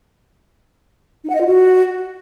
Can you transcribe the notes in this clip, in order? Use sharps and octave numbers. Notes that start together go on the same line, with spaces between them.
D#4
F#5
D#5
F4
F#4